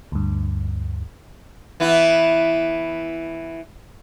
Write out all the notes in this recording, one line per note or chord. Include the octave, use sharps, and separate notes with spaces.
D2 G2
E3 B3 E4